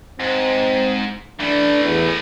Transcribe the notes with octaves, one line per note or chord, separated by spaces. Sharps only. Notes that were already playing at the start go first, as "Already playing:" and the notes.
G#2 C4
E3 A3 D4
E2